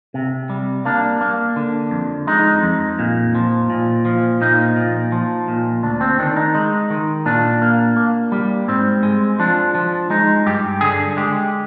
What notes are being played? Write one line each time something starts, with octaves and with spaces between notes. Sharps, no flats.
C3
G3
A#3 D4
A#3
D3
F2
G#3 D#4
F2
A#2
F3
A#2
F3
A#2 D#4
A#2
F3
A#2
D2 D4
C4
D#3 D4
D#4
G#3
D#3
A#2 D4
A#3
A#3
G3
G#2 C4
G#3
F3 D4
F3
G#3 D#4
G2 G4
D3 G#4
G#3 G4